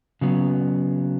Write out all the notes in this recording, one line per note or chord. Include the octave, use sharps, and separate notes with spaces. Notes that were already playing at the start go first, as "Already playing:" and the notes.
C#3 F#3 B3